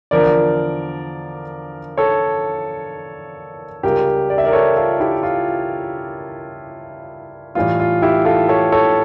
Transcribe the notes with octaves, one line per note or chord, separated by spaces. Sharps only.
E2 D3 F3 A#4 D5
A4 C#5
C#2 C#3 G3 G4 A#4
D5
E5
A#4 D5
A4 C#5
F4 A4
E4 G4
F4
A2 E3 G3 F4
F4
E4 G4
F4 A4
A4 C#5
A4 C#5